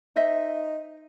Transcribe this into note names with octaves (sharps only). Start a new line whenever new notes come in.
D#4 C5 D#5 E5